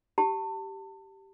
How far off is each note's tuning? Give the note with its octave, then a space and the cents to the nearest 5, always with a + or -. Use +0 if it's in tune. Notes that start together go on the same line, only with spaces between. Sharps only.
G4 -10 A5 +30